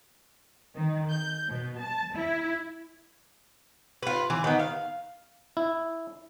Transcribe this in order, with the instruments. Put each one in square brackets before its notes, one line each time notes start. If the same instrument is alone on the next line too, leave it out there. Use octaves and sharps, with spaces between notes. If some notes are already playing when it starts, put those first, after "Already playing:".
[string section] D#3
G6
B2
A5
E4
[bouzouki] F4 B4
E3
D#3 B3
F5
[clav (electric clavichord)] E4